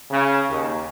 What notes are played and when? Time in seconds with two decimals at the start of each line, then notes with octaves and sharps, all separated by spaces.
0.11 C#3
0.49 D#2